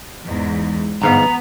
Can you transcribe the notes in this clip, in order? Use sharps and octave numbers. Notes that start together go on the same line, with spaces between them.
E2 G#2
G1 G#2 B3 F5 A#5